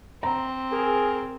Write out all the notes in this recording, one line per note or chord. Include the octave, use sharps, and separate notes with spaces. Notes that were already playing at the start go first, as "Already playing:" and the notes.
C4 A#5
G#4 A#4